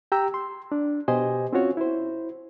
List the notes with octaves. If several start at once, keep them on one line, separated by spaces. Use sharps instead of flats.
G4 G5 A#5 E6
C6
D4
B2 G4 C5 D#5 G#5
C4 C#4 F4 F#4 C#5
E4 C5